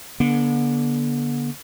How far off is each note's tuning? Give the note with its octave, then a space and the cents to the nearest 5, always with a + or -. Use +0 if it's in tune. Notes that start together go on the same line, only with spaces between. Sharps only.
D3 -20 B3 -45